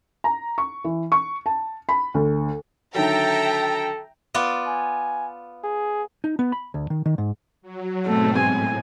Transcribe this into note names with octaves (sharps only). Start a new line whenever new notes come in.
A#5
C#6
E3
C#6
A5
B5
D2
D3 D#3 F#3 A4 E5 G5 A#5
B3 F4 D5
G#5
G#4
D#4
B3
B5
D2
D#3
D#3
G#2
F#3
G#2 B2 A3 C4
A2 G#5